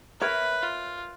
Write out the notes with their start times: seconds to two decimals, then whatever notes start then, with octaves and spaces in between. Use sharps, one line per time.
0.21 A#4 B4 C#5 E5
0.63 F4